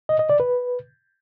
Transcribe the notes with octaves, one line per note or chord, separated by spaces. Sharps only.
D#5
D#5
D5
B4